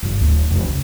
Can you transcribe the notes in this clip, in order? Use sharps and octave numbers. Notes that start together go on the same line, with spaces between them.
G1
D1 D2
E1
C#2